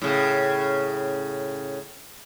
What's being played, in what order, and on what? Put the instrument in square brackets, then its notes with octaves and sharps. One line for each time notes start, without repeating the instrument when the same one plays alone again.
[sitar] A2 C#3